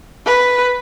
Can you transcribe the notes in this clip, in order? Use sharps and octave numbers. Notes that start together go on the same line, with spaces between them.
B4